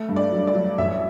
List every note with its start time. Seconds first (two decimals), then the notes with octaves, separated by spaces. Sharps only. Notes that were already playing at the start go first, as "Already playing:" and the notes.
Already playing: A3
0.09 G2
0.16 D5
0.32 F#3
0.47 D5
0.55 F#3
0.78 A1 E5